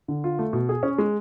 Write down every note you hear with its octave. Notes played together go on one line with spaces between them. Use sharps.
D3
F4
A3
B2
G#4
C#4
G#3